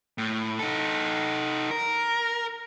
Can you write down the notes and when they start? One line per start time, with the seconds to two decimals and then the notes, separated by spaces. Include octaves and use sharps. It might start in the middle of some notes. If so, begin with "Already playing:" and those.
0.18 A2
0.59 D#4 A4
1.71 A#4